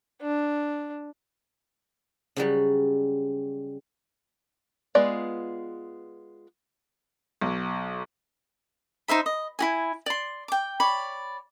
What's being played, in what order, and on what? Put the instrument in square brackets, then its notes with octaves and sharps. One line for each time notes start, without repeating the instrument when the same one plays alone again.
[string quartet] D4
[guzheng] C#3 F#3 G3
[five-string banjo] G#3 B3 F4 B4 D5
[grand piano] B1
[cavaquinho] D#4 C5 E5 B5
D#5
E4 F#4 G#5
D5 C6
G5 D6
C#5 D5 B5